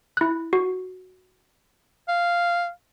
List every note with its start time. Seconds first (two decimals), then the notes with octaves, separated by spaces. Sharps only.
0.17 E4 F#6
0.53 F#4
2.08 F5